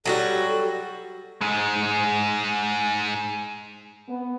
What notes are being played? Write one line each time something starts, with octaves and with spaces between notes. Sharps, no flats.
F#3 G3 F#4 A4
G#2 G#3
B3